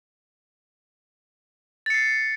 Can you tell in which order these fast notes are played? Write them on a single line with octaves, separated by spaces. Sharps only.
A6 C#7 C7